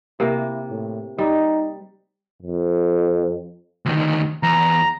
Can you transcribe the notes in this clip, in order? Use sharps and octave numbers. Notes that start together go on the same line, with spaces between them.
C3 A#3 E4
A2
G3 D#4
F2
D2 D#3
E2 A#5